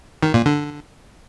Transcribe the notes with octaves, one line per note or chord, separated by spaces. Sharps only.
D#3
A#2
D3